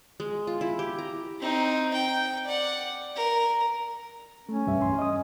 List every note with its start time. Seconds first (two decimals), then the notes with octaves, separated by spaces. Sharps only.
0.20 G#3
0.47 F4
0.61 E4
0.79 G4
0.98 A#5
1.40 C4 D#4
1.94 G5
2.45 D5 F#5
3.16 A#4
4.49 A3 C#4
4.67 C2 G2 E5
4.82 E2 C6
4.99 D#5 D#6